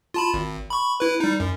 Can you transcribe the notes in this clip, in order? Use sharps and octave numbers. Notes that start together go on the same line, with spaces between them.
F4 A5 B5
G#1
B5 C#6
E4 B4
G3 D#4
F#2